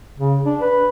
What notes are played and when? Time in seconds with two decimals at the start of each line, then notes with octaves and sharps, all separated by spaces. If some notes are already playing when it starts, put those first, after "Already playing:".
0.18 C#3
0.46 D4
0.61 B4